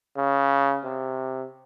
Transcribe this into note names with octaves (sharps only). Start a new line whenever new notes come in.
C#3
C3